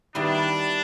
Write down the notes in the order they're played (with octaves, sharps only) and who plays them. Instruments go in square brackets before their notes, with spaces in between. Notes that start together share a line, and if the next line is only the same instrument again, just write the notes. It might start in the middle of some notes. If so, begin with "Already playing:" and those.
[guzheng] D#3 G3 B3 E4 [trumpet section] D4